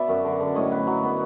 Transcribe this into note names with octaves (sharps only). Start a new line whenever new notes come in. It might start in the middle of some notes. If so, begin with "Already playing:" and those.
Already playing: B2 B3 D5 E5
F#2
D3
D3
A2 C#5 D#5
B3
F#3
B3